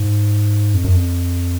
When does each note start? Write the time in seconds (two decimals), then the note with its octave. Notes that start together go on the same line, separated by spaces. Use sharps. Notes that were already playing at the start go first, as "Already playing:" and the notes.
Already playing: G#2
0.74 F2
0.84 F#2
0.95 F2